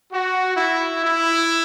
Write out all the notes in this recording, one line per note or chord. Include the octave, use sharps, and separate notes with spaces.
F#4
E4
E4